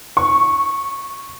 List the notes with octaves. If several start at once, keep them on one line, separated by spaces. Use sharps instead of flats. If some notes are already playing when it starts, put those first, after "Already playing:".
C#6